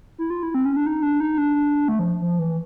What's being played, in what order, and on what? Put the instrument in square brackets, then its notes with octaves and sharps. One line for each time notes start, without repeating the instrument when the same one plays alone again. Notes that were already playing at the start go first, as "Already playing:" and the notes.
[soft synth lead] E4
F4
E4
C4
C#4
D4
D#4
D4
D#4
D4
A3
F3
F3
E3